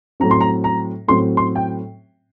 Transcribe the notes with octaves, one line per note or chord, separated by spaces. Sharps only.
A2 F#3 C4 A#5
C6
A#5
A#5
A2 F#3 C4 C6
C6
G5